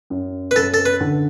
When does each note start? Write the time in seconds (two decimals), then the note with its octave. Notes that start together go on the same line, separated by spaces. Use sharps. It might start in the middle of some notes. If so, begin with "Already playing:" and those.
0.10 F#2
0.51 B4
0.56 F#2 A4
0.74 A4
0.86 B4
1.01 D3